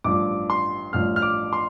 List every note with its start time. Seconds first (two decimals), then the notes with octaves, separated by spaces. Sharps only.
0.04 A1 G2 F3 D6
0.50 C6
0.93 A1 G2 F3 F6
1.16 F6
1.22 D6
1.53 C6